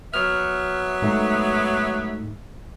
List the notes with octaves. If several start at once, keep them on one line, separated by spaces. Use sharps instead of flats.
F#3 B3 E5 F6
G#2 A3 D#4